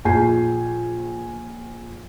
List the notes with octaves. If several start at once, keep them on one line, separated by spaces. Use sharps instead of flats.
A#1 F4 G#4 G#5 G6 C7